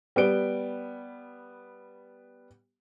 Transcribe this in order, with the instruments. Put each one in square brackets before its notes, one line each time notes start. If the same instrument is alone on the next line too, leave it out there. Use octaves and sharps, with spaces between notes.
[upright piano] G3 B3 D7 G7